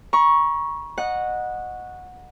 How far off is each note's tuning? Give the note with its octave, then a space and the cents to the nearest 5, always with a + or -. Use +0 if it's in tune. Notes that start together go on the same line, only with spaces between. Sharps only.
A#5 +40 C#6 +0
D#5 -15 F#5 -15